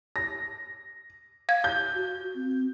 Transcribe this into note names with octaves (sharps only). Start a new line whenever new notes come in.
A#6
F5 G#6
G6
F#4
C4